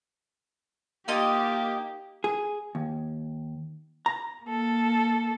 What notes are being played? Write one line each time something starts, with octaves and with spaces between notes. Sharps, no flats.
A#3 D#4 F4 G4 D#5
G#4
D#2
A#5
A#3 A4